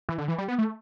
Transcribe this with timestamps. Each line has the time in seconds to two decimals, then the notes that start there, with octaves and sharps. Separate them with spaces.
0.09 E3
0.18 D3
0.28 E3
0.38 G3
0.48 B3
0.58 A3